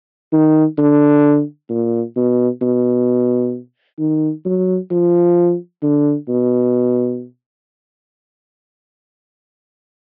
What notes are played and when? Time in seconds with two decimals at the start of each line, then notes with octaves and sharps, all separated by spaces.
0.32 D#3
0.78 D3
1.70 A#2
2.16 B2
2.61 B2
3.99 D#3
4.46 F#3
4.91 F3
5.82 D3
6.28 B2